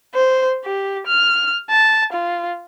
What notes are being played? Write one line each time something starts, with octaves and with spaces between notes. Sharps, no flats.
C5
G4
F6
A5
F4